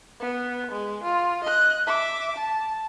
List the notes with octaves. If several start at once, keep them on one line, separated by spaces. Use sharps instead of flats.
B3
G#3
F4
D#5 F#6
E5 D6
A5